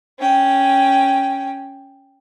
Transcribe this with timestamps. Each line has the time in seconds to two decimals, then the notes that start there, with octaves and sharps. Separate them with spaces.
0.19 C#4 G5